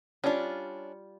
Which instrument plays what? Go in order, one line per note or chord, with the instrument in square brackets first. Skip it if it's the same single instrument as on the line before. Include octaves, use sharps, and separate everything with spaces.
[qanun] G3 F4 [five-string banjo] C#4 D4